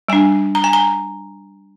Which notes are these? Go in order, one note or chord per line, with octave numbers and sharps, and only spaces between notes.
G3 D4 G#5
A#5
G#5
A#5